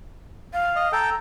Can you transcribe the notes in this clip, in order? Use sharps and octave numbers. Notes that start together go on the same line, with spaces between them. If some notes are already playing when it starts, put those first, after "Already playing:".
F5
D#5
A4 G5 A#5